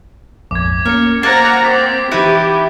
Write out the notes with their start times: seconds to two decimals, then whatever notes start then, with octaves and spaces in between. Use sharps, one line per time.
0.51 A#1 F2 G#2 D6 G#6
0.85 A#3 C#4 A#4 C#7
1.23 A#3 C5 F#5 A#5 G#6 A6
1.65 C4 D6 B6
2.11 E3 D#4 E4 F#4 G4 B4